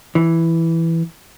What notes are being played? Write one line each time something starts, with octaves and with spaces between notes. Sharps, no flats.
E3